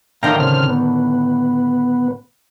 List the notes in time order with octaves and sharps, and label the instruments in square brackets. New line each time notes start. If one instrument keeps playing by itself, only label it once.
[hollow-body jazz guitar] A2 D3 D#3 [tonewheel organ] F5 G5 A#5
[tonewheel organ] C#3 C4 F6
B3